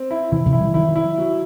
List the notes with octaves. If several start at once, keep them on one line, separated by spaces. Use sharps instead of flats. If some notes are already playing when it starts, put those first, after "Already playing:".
Already playing: C4
E4
C3 E3 E4
C3 E3
E4
E3 G3
D#3 F#3 E4
E4
F#3